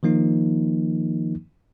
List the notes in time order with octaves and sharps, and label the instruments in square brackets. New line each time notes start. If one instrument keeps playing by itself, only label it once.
[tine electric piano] D#3 F3 A#3 D#4